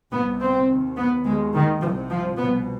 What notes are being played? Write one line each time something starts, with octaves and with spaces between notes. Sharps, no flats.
C2 C3 B3
C4
D#2
B3
D#2 G#3
D#3
C3 F3
C2
F3
C2 B2 B3